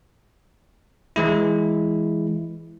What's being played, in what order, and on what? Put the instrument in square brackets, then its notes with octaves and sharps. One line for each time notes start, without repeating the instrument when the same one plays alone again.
[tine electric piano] E3 G#3 E4